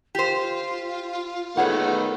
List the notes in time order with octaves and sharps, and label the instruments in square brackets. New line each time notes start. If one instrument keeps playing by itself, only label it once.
[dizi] F4 [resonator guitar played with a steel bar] G4 C5
[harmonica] D#3 A3 B3 [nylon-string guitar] G#4 C#5 F#5